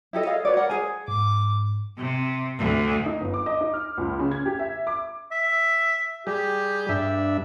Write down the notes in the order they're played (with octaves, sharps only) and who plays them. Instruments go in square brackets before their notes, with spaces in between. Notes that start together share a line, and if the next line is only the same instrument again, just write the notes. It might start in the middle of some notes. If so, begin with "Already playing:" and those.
[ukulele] E4 G4 A4 D#5
G#4 A4 D#5 F5
F#4 B4 C#5 D5
A#4 F#5
G#4 C5 G#5
[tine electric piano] G#2 [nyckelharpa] D6
[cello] C3
D2
[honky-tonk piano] D#4
G1
D6
D#5
D#4
F6
C#2
C#3
G#6
G4
E5
D6
[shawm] E5
[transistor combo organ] G3 G#4 [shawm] G4
[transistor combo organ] G2 D4 E5